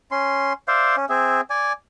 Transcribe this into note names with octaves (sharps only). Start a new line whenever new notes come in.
C#4 C6
C5 D5 E5 F5
C#4
C4 G#4 E5
D5 G#5